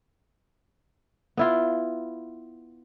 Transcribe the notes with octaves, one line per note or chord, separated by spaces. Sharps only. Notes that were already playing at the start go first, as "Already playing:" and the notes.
B3 E4 F4